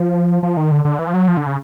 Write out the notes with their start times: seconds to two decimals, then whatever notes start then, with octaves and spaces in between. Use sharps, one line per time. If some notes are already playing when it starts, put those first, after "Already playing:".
Already playing: F3
0.43 F3
0.57 D#3
0.72 D3
0.85 D3
0.99 E3
1.07 F3
1.14 F#3
1.28 F3
1.37 D3
1.46 C#3